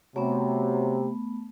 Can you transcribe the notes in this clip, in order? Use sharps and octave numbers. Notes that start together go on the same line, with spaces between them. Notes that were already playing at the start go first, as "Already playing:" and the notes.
C3 F#3 A3 B3